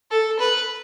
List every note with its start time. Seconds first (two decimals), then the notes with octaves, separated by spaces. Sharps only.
0.11 A4
0.39 B4